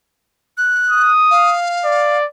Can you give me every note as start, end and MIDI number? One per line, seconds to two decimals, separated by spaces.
0.58 1.11 90
0.90 1.55 87
1.31 2.18 77
1.85 2.26 74